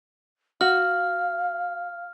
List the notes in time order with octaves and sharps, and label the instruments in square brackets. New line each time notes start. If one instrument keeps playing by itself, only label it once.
[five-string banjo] F#4 [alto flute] F5 [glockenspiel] F6